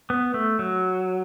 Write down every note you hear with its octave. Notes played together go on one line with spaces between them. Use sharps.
B3
A3
F#3